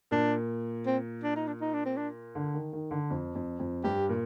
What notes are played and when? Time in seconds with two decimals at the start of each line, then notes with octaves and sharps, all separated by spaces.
0.11 A#2 D4
0.86 C4
1.23 D4
1.36 D#4
1.47 D4
1.61 D#4
1.73 D4
1.85 C4
1.97 D4
2.35 D3
2.54 D#3
2.73 D#3
2.91 D3
3.10 F2
3.35 F2
3.60 F2
3.84 G2 G4
4.09 A#2